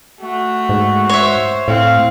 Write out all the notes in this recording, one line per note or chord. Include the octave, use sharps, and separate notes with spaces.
A3 F#4
G#2
C5 C#5 E5
A2 C4 F5